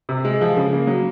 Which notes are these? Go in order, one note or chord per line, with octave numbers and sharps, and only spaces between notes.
C3
G#3
F3
C#3
A#3
F#3